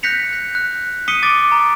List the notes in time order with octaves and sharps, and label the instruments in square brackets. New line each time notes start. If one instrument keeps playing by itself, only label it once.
[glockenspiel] F#6 G6 A#6 B6 C#7 F7
G6
F#6
D#6 B6 C#7 D#7 G7
D6 A6 D7
A#5